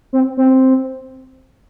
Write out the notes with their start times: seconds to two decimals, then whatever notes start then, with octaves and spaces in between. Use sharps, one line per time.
0.13 C4
0.37 C4